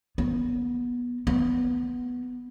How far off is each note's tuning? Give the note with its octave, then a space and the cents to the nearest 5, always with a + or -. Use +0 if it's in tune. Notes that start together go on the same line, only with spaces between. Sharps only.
B3 -20
B3 +0